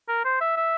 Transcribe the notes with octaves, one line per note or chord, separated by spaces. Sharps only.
A#4
C5
E5
E5